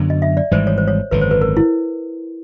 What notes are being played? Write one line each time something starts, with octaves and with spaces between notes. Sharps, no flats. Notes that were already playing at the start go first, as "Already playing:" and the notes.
Already playing: F#2 D3 F#3 B3
D#5
E5
D5
G#1 G#2 E3 G3 C5
C#5
C5
C#5
G#1 F#2 D3 B4
C5
B4
A#4
E4